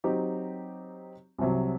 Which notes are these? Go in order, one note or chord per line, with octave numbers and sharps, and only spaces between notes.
F#3 C4 D#4 G4
C2 C3 F#3